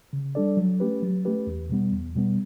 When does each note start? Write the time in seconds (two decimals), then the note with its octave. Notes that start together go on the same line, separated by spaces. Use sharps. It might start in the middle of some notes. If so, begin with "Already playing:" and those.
0.13 C#3
0.35 G3 D4 A4 D5
0.57 F#3
0.80 A3 C#4 G4 B4
1.02 F#3
1.25 A3 C#4 G4 B4
1.47 E2
1.70 B2 G3 B3
1.92 E2
2.15 B2 G3 B3